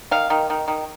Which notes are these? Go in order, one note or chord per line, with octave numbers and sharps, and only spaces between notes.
D#3 F5
D#3
D#3
D#3